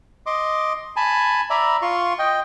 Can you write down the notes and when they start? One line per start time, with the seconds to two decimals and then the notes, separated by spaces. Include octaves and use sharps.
0.26 D#5 C6 D6
0.96 G#5 A5 B5
1.50 D5 E5 A#5 B5
1.82 F4 C6 C#6
2.19 D#5 G5